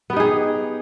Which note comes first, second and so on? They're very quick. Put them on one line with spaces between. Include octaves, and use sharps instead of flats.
B3 G4 D#4 G#4